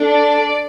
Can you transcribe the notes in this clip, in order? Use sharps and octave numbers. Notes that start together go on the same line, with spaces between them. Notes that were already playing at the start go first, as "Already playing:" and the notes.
Already playing: D4 A4
D5